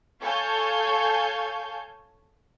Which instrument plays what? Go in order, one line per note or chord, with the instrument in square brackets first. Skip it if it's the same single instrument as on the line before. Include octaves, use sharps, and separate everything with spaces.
[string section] A4 C#5 F5 G#5 A5 G6